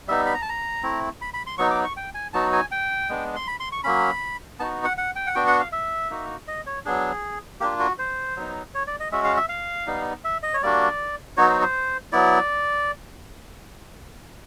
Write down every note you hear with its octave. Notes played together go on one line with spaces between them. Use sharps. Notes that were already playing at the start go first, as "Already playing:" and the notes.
G3 B3 D#4 E5
B5
A#5
A5
A#5
A3 C4 E4
B5
B5
C6
F#3 B3 D#4 C#6
D6
C#6
G5
G#5
F#3 B3 D#4 F#4 A5
G#5
G5
G#3 B3 D4
C6
B5
C6
C#6
F#3 A#3 C#4 B5
B3 D#4 F#4 A5
F#5
F#5
G5
F#5
B3 D4 F#4 G5
F#5
F5
E5
A#3 D#4 F#4
D#5
C#5
F#3 B3 D4 G#4
A#3 D4 F4 G4
F#4
C5
F#3 B3 D#4
C#5
D5
D#5
G#3 C#4 F#4 E5
F5
E5
F5
G3 B3 D#4
E5
D#5
C#5
G3 A#3 D4 F#4 D5
F#3 B3 D#4 F#4 C#5
C5
C5
F#3 B3 E4 D5